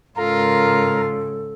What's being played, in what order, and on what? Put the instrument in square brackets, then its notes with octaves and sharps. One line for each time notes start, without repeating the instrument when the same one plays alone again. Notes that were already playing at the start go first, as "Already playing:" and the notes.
[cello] G#2 C#3 [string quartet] F4 [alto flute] A4 [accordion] A#4 A#5